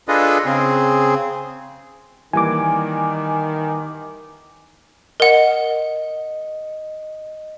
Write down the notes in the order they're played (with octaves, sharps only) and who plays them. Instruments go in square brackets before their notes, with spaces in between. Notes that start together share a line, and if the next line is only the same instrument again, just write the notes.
[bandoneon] D4 F4 G#4 A4 B4 D#5
C#3 C4 G#4
[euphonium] D#3 [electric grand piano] E3 G3 A#3 [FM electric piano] G#5 D6
[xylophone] A#4 F#5 [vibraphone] D#5